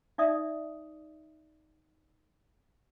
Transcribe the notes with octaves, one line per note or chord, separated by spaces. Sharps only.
D#4 D5 E5 D#6